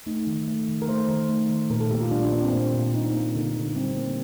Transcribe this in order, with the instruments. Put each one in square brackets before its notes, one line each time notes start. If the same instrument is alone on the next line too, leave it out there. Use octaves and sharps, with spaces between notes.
[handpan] A3 D#4
D#3
A3
D#3
A#4
A3 C5
D#3
A3
D#3
A#2 A#4
A4
A#2 G4
F4
G3 D4
D4
A#3 D4
C4
A#2 D4
A#2
G3 D#4
A#3
D3
D3
G3 C4
A#3